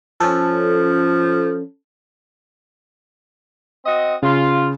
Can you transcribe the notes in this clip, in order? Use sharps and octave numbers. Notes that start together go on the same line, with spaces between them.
F3 C#4 A4
C4 F#4 D#5
C#3 F4